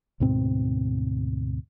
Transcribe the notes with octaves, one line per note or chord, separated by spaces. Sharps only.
D2 G#2 B2 C4